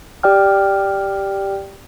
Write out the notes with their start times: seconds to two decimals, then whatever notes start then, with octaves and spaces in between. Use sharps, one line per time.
0.23 G4 D5 G5 F6